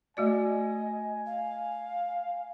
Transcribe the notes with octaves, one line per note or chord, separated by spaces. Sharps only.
A3 F#4 D5 D#5 G#5
F5